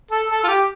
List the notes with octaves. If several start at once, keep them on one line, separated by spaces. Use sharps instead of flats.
A4
A4
F4
G4